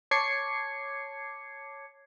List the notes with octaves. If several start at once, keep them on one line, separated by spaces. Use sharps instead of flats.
C#5 A5 D6 G#6 C7 C#7